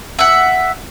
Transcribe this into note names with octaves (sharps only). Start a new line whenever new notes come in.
E5 F#5